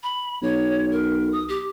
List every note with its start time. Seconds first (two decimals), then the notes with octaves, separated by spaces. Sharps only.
0.03 B5
0.42 B1 C#5
0.92 A#4
1.33 D#6
1.49 G4